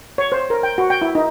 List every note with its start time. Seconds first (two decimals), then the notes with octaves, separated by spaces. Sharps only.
0.18 C#5
0.32 C5
0.50 A#4
0.63 G5
0.78 F#4
0.90 G5
1.02 E4
1.15 D#4